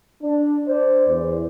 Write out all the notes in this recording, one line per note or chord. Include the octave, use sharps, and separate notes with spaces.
D4
C5 D5
E2